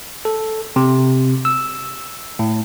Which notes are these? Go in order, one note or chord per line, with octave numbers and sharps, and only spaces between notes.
A4
C3
E6
A2